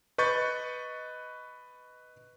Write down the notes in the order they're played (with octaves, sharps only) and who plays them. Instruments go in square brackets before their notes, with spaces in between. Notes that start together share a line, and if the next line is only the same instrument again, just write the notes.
[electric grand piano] B4 D#5 C#6 G6 A6